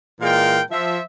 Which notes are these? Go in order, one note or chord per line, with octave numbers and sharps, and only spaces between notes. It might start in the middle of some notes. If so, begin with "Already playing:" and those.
A#2 E3 G#3 A#4 F5 G5
F3 E5